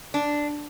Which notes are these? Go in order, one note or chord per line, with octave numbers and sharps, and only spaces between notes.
D4